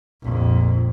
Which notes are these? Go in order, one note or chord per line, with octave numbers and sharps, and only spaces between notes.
A#1 F2